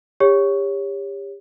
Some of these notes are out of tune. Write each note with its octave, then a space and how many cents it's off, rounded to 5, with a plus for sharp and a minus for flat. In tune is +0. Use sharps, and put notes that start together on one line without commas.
G4 +30 C#5 +0